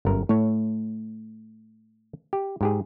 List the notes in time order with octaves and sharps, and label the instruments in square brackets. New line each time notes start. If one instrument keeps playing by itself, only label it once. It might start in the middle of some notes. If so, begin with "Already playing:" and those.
[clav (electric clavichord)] G1 F#2 A#4
[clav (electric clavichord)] A2 C#5 [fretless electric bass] A3
[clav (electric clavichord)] G4
G#2 G4 G#4